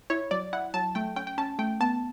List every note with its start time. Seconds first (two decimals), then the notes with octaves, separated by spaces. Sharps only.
0.10 E4 C#5
0.31 F#3 D5
0.53 E4 F#5
0.74 F#3 A5
0.95 A3 G5
1.16 C#4 G5
1.27 G5
1.38 C#4 A5
1.59 A3 G5
1.81 B3 A5